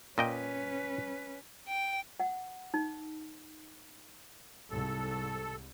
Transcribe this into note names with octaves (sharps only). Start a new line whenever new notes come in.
A#2 C#4 B4 D#5 G5
G5
F#5
D#4
C2 G#2 A4